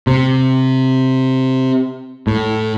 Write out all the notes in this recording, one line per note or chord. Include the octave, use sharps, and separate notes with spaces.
C3
A2